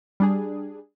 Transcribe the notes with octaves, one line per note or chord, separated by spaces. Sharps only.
G3 D4 G#4